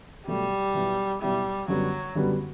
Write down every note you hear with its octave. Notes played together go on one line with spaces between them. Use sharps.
B2 F#3 G3 A3
B2 F#3 B3 E4
B2 F#3 G3 B3 E4
F#2 D3 F#3 G3 B3 F#4
F#2 D3 G3 B3 F#4